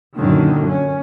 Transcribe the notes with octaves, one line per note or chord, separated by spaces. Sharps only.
F#2 A#2 D3 D#3
C#4